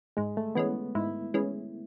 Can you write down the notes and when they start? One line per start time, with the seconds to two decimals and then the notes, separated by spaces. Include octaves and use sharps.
0.17 G#2 G#3
0.37 A3
0.55 E3 G#3 B3 C#4
0.95 G#2 E4
1.34 E3 G#3 C#4